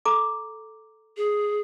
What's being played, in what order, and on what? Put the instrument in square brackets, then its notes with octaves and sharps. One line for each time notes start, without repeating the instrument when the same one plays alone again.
[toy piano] A4 A#5 D6
[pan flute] G#4